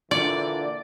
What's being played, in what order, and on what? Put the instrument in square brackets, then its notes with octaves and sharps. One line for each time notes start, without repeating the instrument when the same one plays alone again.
[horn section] A#2 D3 E3 [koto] D5